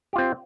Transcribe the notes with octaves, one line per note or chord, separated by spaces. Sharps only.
C4 F4 G4